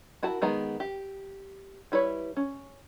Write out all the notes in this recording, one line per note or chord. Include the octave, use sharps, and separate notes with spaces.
E4 F#4 A#4 A5
D#3 G#3 B3 A#5
G4
G3 E4 B4 C#5
C#4